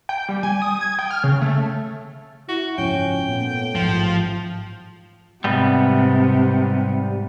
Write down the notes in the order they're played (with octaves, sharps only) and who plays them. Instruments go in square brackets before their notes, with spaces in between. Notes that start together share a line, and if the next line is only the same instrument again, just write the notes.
[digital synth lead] G5
G3
G#5
D#6
G#6
G5
F6
C#3
A3
[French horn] E4 [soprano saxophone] F#4
[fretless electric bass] F#1 G#2 F3 [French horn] C#4 [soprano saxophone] G5
[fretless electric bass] A#2 B3 [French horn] A3
[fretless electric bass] A1 G#2 [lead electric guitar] F3
[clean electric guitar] G#2 [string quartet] C3 [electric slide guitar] G3 B3